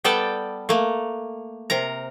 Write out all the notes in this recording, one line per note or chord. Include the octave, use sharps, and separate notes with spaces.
G3 B3 A4 D5 G5 A5
A3 A#3
C3 A#4 A#5